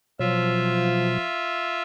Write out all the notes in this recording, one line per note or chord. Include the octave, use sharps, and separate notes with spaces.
B2 F3 F#3 F4 E5